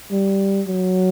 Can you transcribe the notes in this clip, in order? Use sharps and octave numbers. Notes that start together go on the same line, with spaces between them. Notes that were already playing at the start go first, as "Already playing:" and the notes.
G3
F#3